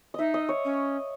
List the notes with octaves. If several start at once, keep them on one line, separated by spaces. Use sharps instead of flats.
D#4 D#5 E5
D#5
C#5
C#4